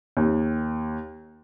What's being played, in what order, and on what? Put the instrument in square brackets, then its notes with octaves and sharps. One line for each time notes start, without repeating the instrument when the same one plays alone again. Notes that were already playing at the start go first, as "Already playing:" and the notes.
[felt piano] D#2